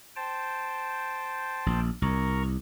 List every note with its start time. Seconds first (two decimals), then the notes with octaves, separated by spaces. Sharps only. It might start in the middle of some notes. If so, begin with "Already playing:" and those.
0.16 C5 G5 A5
1.66 A#1
2.02 C2 A#4 A#5 C#6